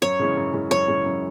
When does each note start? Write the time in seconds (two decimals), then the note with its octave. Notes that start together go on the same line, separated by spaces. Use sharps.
0.02 F#2 C#5
0.19 C#3 E3 G#3 C#4
0.36 F#2
0.53 C#3 E3 G#3 C#4
0.70 F#2 C#5
0.88 C#3 E3 G#3 C#4
1.05 F#2